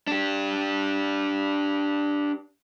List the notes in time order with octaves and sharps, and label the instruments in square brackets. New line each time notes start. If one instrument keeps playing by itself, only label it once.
[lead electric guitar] D4 G4